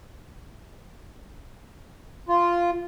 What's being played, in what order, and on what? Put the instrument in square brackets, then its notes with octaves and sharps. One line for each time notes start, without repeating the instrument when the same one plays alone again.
[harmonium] F4